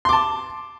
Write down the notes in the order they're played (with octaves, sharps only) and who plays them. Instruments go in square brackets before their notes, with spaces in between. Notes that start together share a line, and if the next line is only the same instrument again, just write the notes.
[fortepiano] C6
D6
A5